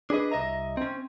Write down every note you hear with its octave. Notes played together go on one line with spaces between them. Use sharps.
D4 G#4 B4 D#5
C2 D#5 E5 A#5
C4 C#4